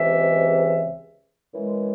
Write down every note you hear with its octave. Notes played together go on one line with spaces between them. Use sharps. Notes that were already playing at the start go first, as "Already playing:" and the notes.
Already playing: C#2 C3 E3 G#3 E5
F#2 E3 G#3